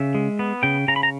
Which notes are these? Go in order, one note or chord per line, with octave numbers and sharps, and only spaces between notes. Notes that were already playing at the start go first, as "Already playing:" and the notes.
Already playing: C#3 E5
G#3
B3
C#3 G5
C#3 A#5
B5
A#5